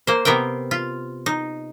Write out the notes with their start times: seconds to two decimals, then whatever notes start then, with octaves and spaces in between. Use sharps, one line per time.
0.07 A#3 C5
0.25 C3 B3 A#4 F5 G5
0.71 F4
1.26 D#4